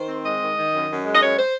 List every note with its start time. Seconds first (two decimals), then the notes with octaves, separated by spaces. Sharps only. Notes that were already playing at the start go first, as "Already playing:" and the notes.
Already playing: D#3 C5
0.08 C4
0.24 G#3 D#5
0.41 D#3
0.57 D#3
0.73 F#2
0.89 F#2
1.04 G#3
1.14 D#5
1.21 F#2 C#5
1.37 C5